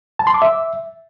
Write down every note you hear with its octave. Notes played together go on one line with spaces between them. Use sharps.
A5
C6
D6
E5